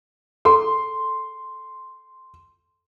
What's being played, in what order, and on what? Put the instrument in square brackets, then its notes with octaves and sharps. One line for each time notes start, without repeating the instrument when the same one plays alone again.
[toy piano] G#4 A4 A#5 [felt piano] C6